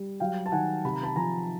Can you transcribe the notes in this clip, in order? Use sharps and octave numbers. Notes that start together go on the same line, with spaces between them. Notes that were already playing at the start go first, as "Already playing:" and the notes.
Already playing: G3
F#3 F5 G5
A5
D#3 F#5 G#5
C3 B5
A#5
A5 B5
F3 G#5 A#5